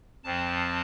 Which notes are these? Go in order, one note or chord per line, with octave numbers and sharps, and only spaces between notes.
F2 F3 C4 A5